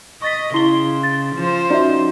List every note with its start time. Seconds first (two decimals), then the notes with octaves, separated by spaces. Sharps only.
0.22 D#5 C#6 A6 B6
0.54 C#3 E4 C6 G7
1.03 A6
1.35 F3 C5
1.70 C#4 D#4 F#4 D5 E5